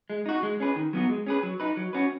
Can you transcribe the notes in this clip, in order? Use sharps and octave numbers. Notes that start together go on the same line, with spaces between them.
G#3
D#4 F#4
G#3
C#4 G#4 B4
D#3
F#3 B3 F#4
G#3
C#4 G#4 B4
F#3
D#4 B4
F#3
C#4 F#4 B4